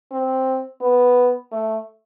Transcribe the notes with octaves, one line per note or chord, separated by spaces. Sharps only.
C4
B3
A3